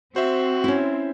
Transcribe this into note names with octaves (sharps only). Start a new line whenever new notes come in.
C4 F#4 C5 E5
C#4 E4